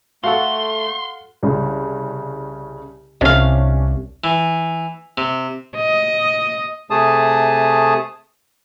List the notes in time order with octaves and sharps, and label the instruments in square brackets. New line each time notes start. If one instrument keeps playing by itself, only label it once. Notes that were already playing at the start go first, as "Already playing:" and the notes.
[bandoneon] A3 [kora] F#4 A4 [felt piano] F5 F#5 [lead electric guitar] C6
[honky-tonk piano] C2 C#3
[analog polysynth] C2 [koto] C3 F5 [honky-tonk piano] C#4 D4
[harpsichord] E3
C3
[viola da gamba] D#5
[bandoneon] C3 A3 G#4 A5 D#6